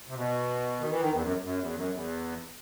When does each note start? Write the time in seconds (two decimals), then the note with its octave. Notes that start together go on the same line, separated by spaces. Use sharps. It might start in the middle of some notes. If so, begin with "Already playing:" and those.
0.08 C3
0.15 B2
0.79 D#3
0.90 E3
1.00 D#3
1.11 E2
1.22 F#2
1.43 F#2
1.59 E2
1.74 F#2
1.91 E2